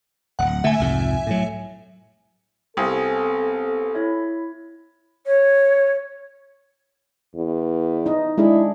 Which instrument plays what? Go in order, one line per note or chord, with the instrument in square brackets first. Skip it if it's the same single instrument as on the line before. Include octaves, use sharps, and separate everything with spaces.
[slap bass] D1 [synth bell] F#5
[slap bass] D3 A3 [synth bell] E5 G#5
[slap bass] C2 F2 G#2
A2 F#3
[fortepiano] C2 [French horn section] B3 C4 A4 [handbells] F5 G#5 D#6
[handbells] E4 C#5 E5
[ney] C#5
[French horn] E2
[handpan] D#4 D#5
[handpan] G#3 D4 G#4 [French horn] E4